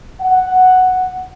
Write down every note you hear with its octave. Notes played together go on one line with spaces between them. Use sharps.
F#5